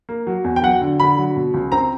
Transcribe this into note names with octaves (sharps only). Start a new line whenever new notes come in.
A#3
F#3
E2
G5
F#3 F#5
D3
D3 B5
F#3
B2
C#2
C4 A#5